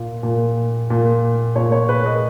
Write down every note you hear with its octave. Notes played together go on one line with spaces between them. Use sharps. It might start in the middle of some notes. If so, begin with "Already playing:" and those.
Already playing: A#2
A#2
A#2
A#2 C#5
C#5
B4
D#5